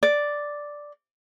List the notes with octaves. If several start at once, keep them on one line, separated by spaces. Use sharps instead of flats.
D5